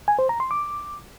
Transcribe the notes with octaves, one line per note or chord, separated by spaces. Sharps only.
G#5
C5
A#5
C6
D6